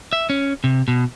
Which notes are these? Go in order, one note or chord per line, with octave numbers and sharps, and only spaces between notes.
E5
C#4
C3
B2